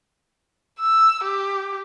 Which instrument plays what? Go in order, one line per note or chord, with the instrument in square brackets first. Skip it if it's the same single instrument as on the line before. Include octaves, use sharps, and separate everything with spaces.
[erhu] E6
G4